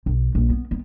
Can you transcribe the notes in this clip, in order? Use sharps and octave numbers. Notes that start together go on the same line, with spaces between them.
B1
A#1
B3
B3